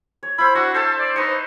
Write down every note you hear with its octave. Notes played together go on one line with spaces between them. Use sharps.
C#5
E4 C5 B5
D4 F#4 E5 C#6
A4 C5 E5 A5
D5
D#4 B4 C5 C#6